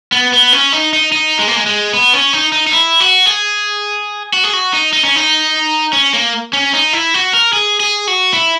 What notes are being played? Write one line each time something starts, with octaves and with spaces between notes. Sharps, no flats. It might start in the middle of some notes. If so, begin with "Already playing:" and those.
B3
B3
C#4
D#4
D#4
D#4
G#3
A#3
G#3
G#3
B3
C#4
D#4
D#4
D#4
E4
F#4
G#4
F#4
G#4
F#4
D#4
D#4
C#4
D#4
C#4
A#3
C#4
D#4
E4
F#4
A#4
G#4
G#4
F#4
E4